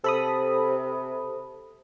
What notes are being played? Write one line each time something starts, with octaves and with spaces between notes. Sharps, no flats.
C3 A4 B5 D#6